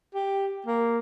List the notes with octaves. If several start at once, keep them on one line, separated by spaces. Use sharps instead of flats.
G4
A#3